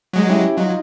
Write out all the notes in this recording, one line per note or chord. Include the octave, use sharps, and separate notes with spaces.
F#3 G#3
C#4 E4 G4
F#3 D#4 F4